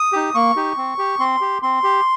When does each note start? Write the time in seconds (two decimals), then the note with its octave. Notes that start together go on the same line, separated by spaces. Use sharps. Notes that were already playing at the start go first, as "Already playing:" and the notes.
Already playing: D#6
0.12 D#4 G4
0.35 A#3 C#6
0.56 D#4 G4
0.77 C4
0.98 G4
1.19 C4 C6
1.41 G4
1.62 C4 C6
1.84 G4